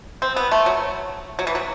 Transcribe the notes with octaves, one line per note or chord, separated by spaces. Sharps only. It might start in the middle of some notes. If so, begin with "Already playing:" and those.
C4
B3
A3
F#3
F#3
E3
F#3